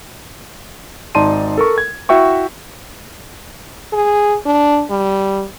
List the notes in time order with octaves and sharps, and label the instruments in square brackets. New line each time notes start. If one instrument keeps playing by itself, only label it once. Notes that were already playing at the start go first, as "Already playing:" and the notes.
[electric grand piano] G#1 D#4 D5 A5 C6 D#7
A4 A#4 C#6
G#6
E4 F#4 E5 G5 C#6
[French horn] G#4
D4
G3